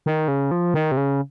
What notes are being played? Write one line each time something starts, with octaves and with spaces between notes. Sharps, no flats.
D#3
C#3
F3
D#3
C3
C#3